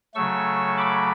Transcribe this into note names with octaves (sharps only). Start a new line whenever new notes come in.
C#3 F#3 A3 C#6 E6
B5 D6